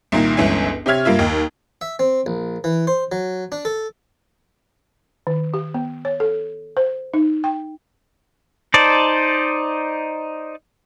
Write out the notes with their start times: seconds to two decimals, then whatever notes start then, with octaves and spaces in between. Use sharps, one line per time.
0.12 C2 A#2 D#3 A#3
0.37 G1 C#2 E3 C#4 E5 G#5
0.86 C3 G4 C#5 E5 F6 G#6
1.05 G2 A#3 F4 E5
1.19 D#2 D#4 G5
1.81 E5
1.99 C4
2.26 A#1
2.64 E3
2.87 C5
3.12 F#3
3.52 D4
3.65 A4
5.27 D#3
5.54 G4
5.74 B3
6.05 C#5
6.20 A4
6.77 C5
7.14 D#4
7.44 G5
8.74 D#4 C5 D5 A5